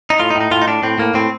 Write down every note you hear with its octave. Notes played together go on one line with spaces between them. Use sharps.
D#4
A2 F4
D#4
A2
D#4
A2 F4
D#4
A2 D4
A2 C4
A2 A#3
A2 C4